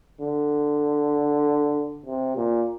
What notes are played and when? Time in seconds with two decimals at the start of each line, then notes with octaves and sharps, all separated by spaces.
0.21 D3
2.06 C3
2.37 A#2